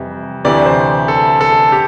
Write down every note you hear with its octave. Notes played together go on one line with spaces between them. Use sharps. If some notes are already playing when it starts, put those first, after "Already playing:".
Already playing: F2 C3 E3 G3
D2 C3 E3 D5
C5
A4
A4
G4